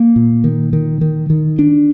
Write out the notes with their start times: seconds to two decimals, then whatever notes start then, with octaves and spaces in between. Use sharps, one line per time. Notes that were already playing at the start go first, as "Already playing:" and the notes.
Already playing: A#3
0.16 A#2
0.44 D#3
0.73 D#3
1.01 D#3
1.30 D#3
1.59 D4